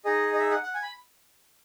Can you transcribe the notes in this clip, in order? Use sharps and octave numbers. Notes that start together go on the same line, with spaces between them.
D#4 G#4 D#5
D#5
E5
F#5
F#5
G#5
B5